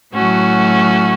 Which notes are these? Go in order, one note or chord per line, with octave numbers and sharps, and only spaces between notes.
A2 F#3 A3 C#4 F#4